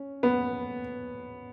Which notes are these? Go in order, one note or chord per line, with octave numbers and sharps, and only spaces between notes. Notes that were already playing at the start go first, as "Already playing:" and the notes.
Already playing: C#4
B3